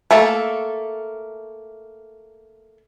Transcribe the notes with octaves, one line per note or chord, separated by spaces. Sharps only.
A3 A#3 A4